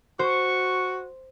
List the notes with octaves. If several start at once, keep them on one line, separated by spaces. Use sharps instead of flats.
F#4 C5 C#6